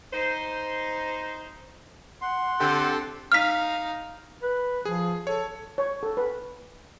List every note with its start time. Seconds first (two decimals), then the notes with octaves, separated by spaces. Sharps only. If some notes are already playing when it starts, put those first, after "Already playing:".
0.13 D#4 C5
2.21 F#5 C6
2.60 D3 C4 G4 A4
3.32 D#4 F5 F6 B6
4.42 B4
4.85 F3 G#4
5.27 A4 C#5
5.78 C#5
6.03 A4
6.17 B4